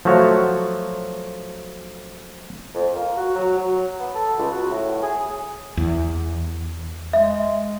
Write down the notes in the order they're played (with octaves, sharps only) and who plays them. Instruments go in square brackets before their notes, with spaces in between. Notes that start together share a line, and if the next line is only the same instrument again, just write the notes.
[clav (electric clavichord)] F3 F#3 A3 F#4 C#5
[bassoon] F2
A#3
F#4
F#3
F#3
B3
A4
C#2
F#4
A2
G#4
[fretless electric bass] E2
[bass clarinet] G#3 [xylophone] E5